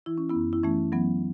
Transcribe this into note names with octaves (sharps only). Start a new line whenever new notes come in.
E3 E4
C#4
B3 E4
F#2
E4
E3 A3 C#4
E3 F#3 B3